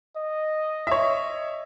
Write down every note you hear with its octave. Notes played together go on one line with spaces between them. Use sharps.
D#5
C#5 E5